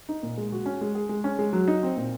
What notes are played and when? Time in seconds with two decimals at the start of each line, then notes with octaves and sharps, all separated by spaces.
0.09 D#4
0.23 A#2
0.37 G#3
0.52 F#4
0.66 C#4
0.81 G#3
0.95 G#4
1.09 G#3
1.24 C#4
1.39 G#3
1.53 F#3
1.68 D#4
1.83 C4
1.97 A#2